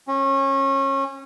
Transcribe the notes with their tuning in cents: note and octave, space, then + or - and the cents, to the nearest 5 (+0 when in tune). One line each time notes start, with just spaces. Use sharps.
C#4 -25